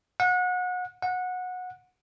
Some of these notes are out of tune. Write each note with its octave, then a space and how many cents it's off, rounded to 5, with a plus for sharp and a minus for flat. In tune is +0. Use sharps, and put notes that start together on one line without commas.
F#5 -30
F#5 -20